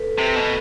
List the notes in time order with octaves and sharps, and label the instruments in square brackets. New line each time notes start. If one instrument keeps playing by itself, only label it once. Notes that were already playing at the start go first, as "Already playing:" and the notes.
Already playing: [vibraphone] A4 B4
[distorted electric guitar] C3 [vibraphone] B4
[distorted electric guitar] B2